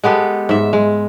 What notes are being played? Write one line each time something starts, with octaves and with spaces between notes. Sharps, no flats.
G#3 B3 G4 A4
G#2 E5
G#3